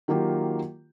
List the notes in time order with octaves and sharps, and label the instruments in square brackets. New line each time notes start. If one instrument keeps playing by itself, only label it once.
[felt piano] D#3 F#3 A#3 F4 G4